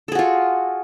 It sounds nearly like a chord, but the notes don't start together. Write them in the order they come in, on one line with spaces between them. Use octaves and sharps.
A4 G#4 F#4 F4